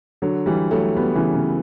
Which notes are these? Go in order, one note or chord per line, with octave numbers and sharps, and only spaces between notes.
D3 F#3
E3 G3
F#3 A3
G3 B3
C#3 E3
C#3